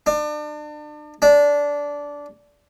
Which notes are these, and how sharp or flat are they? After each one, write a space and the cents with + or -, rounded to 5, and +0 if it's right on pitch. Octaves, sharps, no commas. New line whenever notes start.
D4 +35
D4 -15